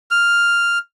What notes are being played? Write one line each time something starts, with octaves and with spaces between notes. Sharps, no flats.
F6